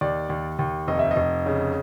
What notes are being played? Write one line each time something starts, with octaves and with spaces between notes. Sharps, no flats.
D#2 D5
D#2
D#2
F1 D#5
E5
D#5
F1
C#3